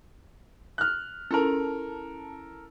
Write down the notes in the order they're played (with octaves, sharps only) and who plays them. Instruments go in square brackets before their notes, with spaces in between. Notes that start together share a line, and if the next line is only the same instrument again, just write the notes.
[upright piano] F6 F#6
[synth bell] C#4 E4 A5 [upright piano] A4 A#4